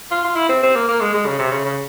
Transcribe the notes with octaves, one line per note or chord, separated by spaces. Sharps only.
F4
F4
E4
C4
C4
A#3
A#3
G#3
G#3
C#3
C3
C#3
C#3